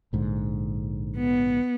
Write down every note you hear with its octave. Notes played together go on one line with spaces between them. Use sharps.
A#1 G#2 D3
B3